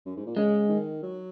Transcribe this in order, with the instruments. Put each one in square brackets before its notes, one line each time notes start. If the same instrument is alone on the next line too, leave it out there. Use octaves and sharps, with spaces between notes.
[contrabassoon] F#2
G#2
A#2
[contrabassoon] C#3 [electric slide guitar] G#3
[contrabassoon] D#3
F#3